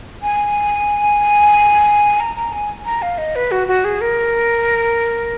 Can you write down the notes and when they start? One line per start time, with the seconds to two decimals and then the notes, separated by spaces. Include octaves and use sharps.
0.22 G#5
2.20 A#5
2.36 A#5
2.53 G#5
2.85 A#5
3.02 F5
3.18 D#5
3.36 B4
3.51 F#4
3.68 F#4
3.85 G#4
4.01 A#4